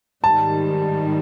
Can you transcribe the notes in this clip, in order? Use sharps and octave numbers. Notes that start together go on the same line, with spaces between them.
G#2 D#3 G3 A5